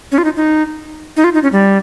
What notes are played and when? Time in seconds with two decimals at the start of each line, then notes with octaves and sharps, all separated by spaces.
0.12 C#4
0.18 F4
0.24 D#4
0.36 D#4
1.17 D#4
1.24 F4
1.34 D#4
1.43 C#4
1.52 G3